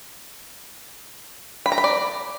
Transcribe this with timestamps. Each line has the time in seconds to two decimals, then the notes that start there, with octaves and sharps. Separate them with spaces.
1.66 B5
1.72 A#5
1.78 B5
1.84 D5